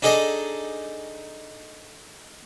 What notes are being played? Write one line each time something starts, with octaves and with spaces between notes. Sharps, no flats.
D4 D#4 G#4 A4 D5 D#5